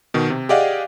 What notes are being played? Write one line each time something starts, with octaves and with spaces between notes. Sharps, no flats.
B2 D#3
C3
G4 G#4 D5 D#5 F5 F#5